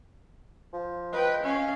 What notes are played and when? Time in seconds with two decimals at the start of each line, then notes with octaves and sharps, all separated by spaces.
0.73 F3
1.13 B4 D#5 G5
1.42 C#4 F5